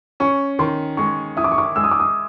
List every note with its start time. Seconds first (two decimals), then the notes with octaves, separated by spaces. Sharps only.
0.20 C#4 C#6
0.59 D#3 C6
0.97 G#3 C#6
1.37 E4 D#6
1.44 D6
1.52 C#6
1.58 D6
1.76 G#3 E6
1.84 D#6
1.91 D6
2.00 D#6